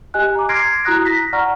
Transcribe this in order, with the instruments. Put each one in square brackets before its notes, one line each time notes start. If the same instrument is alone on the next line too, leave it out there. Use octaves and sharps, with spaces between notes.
[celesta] G4 D#5 G#5 F#6
A#5 D6
C6 F6 G#6 A#6 C7 D7
E4 F#4 A#5 D#6 F#6 A#6
A#6 B6
D5 F#5 A#5 C#6 F6